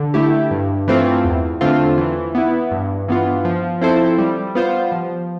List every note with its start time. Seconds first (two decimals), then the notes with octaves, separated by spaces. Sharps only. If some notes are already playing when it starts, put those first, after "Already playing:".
Already playing: D3
0.14 A3 E4 G4
0.51 G2
0.88 E3 A3 C4 F4
1.24 E2
1.61 D3 A3 C4 F4
1.98 E3
2.35 B3 E4
2.71 G2
3.08 E3 B3 F4
3.45 F3
3.81 C4 E4 A4 C5
4.18 G3
4.55 B3 F4 C5
4.92 F3